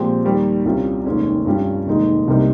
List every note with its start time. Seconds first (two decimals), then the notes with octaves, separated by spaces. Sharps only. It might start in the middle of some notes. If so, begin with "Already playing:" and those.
Already playing: A#2 F3 G#3 C4 G4
0.25 D#2 D#3 G3
0.65 C2 C3 G3 C#4 F4
1.06 F1 D#2 D#3 G#3 C#4
1.46 G2 G3 C#4 F4
1.86 F1 D#2 D#3 G#3 D#4
2.28 C2 C3 G3 A#3 D#4